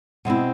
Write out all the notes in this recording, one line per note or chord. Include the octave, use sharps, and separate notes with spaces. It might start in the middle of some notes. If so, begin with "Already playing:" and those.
B2 G#3 C4 E4